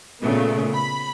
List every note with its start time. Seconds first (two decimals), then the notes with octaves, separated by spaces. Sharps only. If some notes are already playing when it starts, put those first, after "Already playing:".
0.20 A#2 C#3 A3 B3
0.75 B5